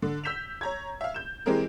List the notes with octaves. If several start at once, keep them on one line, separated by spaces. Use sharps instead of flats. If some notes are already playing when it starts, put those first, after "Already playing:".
D3
E6 G6 B6 E7 F7
C#5 A#5 G#6
E5 F5
G6 E7
E3 G#3 C4 G4 G#4 A#4